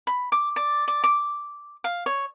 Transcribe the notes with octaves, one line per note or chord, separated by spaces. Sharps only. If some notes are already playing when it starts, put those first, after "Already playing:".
B5
D6
D5
D5
D6
F5
C#5